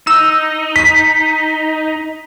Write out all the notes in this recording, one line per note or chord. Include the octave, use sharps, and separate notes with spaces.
D#4 E6
B6